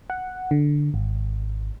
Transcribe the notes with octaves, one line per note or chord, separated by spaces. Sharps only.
F#5
D3
G#1